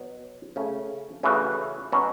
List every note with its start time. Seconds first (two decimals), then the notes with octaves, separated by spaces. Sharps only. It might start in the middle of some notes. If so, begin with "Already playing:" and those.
Already playing: B2 F#3 B3
0.56 C#3 A3 C#4
1.23 C#3 E3 A3 F#4 B4
1.92 B2 F#3 C#4 F#4 B4